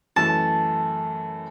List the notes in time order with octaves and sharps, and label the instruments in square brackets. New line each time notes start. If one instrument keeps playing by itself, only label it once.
[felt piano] F#2 E3 A3 [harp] A5